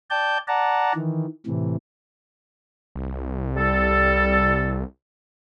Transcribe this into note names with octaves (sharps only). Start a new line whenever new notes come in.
D5 G5 A5 G6
D5 F#5 A5 A#5
D#3 E3
A2 C3 E3
C2
G3 A4